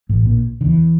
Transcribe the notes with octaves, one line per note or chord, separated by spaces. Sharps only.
A1 A2
A#1 A#2
D3
E2 E3